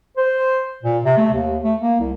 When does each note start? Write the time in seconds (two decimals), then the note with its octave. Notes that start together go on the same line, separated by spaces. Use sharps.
0.17 C5
0.83 A#2
1.05 C3
1.17 A3
1.34 D#2
1.64 A3
1.82 A#3
2.00 C2